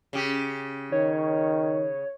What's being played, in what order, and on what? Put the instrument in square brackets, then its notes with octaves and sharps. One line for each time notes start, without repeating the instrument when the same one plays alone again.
[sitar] C#3 G4
[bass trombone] D#3 [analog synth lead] C#5